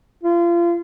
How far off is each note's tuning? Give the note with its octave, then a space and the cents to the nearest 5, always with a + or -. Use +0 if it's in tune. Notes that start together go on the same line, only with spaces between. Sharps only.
F4 -30